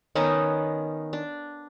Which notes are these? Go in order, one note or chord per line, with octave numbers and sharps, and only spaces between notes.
D#3 B3 C#4 D#4
D4